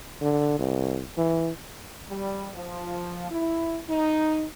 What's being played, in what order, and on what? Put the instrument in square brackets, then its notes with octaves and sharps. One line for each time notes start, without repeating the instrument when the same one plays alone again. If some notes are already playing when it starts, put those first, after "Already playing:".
[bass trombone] D3
C2
E3
[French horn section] G3
F3
E4
D#4